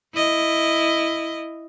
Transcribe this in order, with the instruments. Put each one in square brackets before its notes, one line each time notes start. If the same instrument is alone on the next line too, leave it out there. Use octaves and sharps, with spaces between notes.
[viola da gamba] E4 D#5